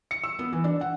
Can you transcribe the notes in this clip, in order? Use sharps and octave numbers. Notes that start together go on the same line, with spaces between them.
C#7
E6
B3
E3
D4
F#5